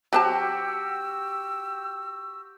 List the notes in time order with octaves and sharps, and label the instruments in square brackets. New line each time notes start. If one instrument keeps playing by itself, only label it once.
[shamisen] F#3 C4 A5 [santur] F#4 G4 [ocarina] E6